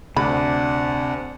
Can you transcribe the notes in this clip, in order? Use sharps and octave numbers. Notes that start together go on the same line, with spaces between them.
D2 C3 D4 F#5 B5